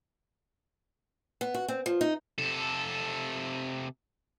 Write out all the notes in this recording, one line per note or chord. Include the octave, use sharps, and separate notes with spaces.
B3
F#4
C4
F3
D#4
C3 A4